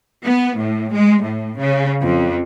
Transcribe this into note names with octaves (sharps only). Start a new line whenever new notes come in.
B3
A2
G#3
A2
C#3
F2